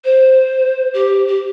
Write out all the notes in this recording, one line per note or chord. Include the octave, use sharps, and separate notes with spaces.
C5
G4
G4